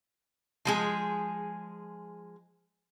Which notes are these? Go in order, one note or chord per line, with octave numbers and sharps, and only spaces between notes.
F3 G#3 G#4